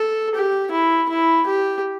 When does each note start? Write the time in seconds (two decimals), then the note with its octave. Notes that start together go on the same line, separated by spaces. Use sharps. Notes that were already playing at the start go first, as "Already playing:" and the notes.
Already playing: A4
0.35 G4
0.72 E4
1.10 E4
1.46 G4